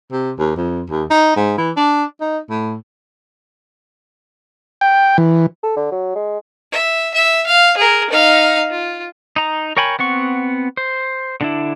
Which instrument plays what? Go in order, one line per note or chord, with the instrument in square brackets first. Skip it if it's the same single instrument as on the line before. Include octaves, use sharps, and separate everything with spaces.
[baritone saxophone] C3
D#2
F2
D#2
D#4
G#2
E3
D4
D#4
A2
[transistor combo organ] G5
E3
[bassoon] A4
D3
F#3
G#3
[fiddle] E5
E5
F5
G#4 A#4
D#4 F5
F4
[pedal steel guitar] D#4 A#5
A#4 C#5 G5 G#5 B5
B3 C4 F#5 C#6
C5
D3 D4 E4